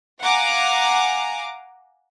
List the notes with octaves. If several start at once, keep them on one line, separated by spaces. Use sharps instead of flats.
F5 F#5 G#5 A#5 D6